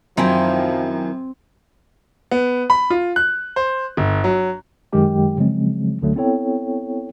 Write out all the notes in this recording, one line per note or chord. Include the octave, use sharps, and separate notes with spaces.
F#2 D#3 F3 C4 E4 G#5
B3
B5
F4
F#6
C5
G1
F#3
F#2 D#3 F#3 G#3 G4 G5
C#3 F3 F#3 G#3 C4
C#2 D3 F#3 A3
B3 C4 E4 A4 C#5 G5